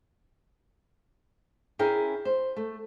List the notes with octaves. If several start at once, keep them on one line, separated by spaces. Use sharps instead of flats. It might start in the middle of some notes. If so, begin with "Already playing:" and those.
C#4 E4 G#4 A#4 C#5 G5
C5
A3